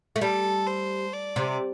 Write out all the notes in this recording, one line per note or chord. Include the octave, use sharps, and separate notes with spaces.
A3
G3 A4
C5
D5
C3